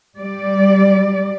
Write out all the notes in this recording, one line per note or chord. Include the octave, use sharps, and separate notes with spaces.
G3 D5